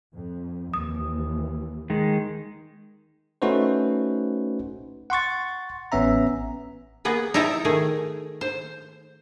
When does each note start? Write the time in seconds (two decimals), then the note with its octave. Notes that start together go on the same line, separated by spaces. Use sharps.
0.14 F2
0.74 D#2 E3 D#6
1.90 D#3 G#3
3.42 A3 C#4 D#4 F#4 B4 C5
5.10 F#5 C6 C#6 A6
5.92 A1 B3 C#4 E5 A#5
7.05 A#3 B3 G#4 B4
7.34 D#4 E4 E5 G5 A5 A#5
7.65 D#3 A3 G#4
8.41 C5